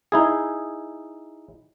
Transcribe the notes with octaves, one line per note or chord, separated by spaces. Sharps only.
D#4 E4 G#4